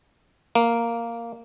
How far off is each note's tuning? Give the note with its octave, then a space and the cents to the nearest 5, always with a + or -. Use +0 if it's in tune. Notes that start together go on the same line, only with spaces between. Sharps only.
A#3 -5